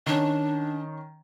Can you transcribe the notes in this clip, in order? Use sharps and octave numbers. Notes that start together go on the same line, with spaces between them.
D#3 C#4 D4